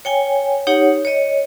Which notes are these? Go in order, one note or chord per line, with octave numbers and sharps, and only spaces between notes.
C#5 G5 G#5
D#4 G4 C#5 F#5
C#5 D#5